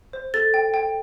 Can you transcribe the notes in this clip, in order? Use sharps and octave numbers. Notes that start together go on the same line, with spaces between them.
C5
A4 A6
G5
G5